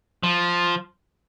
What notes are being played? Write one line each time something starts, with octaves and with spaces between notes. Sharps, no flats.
F3